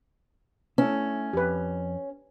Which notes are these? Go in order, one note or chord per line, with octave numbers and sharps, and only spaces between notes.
A3 C#4 E4
F2 G4 B4